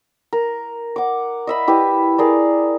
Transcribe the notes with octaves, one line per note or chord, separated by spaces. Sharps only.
A#4
F#5 D6
D#5 E5 B5
E4 G4 B4 E5
G#4 A#4 D5